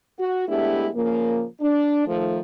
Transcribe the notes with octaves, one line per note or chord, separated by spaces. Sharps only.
F#4
G#3 A3 B3 D4 E4 G4
A#2 C#3 F3 A#3
D4
D#3 F3 A3